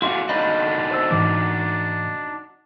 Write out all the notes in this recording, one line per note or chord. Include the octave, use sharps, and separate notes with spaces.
E4 F#4 D5 F5 F#5 C6
D4 D#4 F#4 D#5 B5
C5 E6
G#2 E3 D6